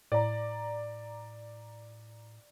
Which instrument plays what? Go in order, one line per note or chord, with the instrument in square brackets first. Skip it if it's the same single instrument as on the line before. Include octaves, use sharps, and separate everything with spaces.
[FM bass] A2 [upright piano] D5 A#5